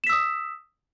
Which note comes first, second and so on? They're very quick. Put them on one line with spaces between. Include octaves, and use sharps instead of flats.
E7 B6 E6 D#6